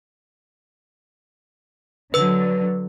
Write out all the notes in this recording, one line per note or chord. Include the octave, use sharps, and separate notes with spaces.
D3 F#3 B4 E6